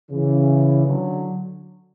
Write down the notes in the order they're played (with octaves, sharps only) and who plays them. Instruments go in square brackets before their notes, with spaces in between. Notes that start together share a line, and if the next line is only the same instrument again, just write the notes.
[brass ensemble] C#3 E3
D3 F#3